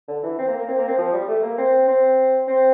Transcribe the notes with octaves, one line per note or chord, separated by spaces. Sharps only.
D3
E3
C4
A#3
A#3
C4
A#3
C4
F3
G3
A3
A#3
C4
C4
C4